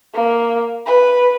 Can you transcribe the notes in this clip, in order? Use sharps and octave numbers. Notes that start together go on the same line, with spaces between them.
A#3
B4